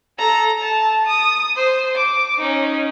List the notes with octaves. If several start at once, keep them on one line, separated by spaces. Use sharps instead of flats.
A4 A#5
A5
D#6
C5
D6
C#4 D#4